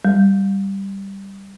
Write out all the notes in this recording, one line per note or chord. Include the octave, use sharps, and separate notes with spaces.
G3